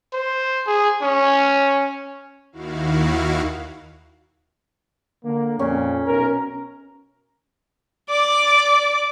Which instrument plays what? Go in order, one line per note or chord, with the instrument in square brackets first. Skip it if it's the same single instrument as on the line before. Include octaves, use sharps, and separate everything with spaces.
[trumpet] C5
G#4
C#4
[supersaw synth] D#2 D#3 E4 F#4 F5
[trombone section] D3 A#3
[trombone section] F2 A#2 [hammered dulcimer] C#4
[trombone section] B1 A#4
[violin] D5 D6